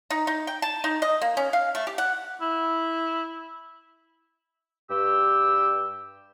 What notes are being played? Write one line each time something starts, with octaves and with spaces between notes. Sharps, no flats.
D#4
D#4
G5
A5
D#4
D#5
A#3
C#4
F5
A3
G4
F#5
E4
G2 G4 E6